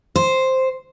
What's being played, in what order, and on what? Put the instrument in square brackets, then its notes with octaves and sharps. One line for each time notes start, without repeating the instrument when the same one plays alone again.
[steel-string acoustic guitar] C5